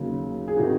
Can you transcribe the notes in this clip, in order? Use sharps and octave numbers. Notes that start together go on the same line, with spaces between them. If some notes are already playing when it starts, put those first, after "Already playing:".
Already playing: D#2 C#3 F#3
G#4
C3 D#3 D#4 F#4